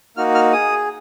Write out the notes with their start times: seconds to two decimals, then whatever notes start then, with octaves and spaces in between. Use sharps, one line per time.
0.17 A#3 D#4 F#4 F6
0.35 F6
0.53 G#4 D#6